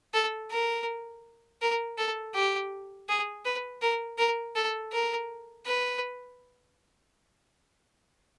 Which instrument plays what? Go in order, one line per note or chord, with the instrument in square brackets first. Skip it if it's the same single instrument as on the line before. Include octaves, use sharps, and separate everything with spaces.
[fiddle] A4
A#4
A#4
A4
G4
G#4
B4
A#4
A#4
A4
A#4
B4